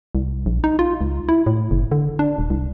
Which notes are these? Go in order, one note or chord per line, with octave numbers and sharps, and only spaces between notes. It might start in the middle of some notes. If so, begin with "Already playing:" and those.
C2
A#1
D#4
F4
C#2
E4
A2
F#1
D3
D4
D#1
C2